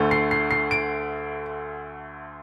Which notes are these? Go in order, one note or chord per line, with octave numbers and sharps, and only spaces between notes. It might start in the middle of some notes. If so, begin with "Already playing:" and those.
Already playing: D2 D3 A3
C7
C7
C7
D7